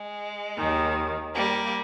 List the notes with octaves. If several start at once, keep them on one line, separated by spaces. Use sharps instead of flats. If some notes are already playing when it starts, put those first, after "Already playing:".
Already playing: G#3
D#2 D#3
G3 A#3